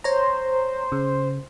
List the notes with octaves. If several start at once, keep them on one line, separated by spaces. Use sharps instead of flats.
C5 C#5 A#5
C#3